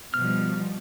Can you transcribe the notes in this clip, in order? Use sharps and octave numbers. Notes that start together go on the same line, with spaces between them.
B2 F3 G3 F6